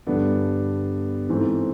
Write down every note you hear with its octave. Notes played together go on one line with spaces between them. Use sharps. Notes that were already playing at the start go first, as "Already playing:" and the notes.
G2 D3 G3 B3 D4
G#2 E3 A3 C4